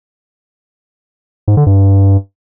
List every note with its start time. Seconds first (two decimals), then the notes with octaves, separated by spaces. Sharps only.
1.48 G#2
1.57 D3
1.66 G2